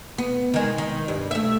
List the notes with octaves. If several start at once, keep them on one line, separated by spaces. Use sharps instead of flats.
B3
D#3 G#3
D#3
G2
A3 E5